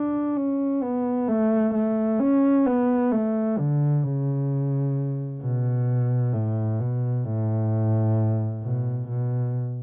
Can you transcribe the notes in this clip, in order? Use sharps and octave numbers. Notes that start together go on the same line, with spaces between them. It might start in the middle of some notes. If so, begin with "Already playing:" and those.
Already playing: D4
C#4
B3
A3
A3
C#4
B3
A3
D3
C#3
B2
A2
B2
A2
B2
B2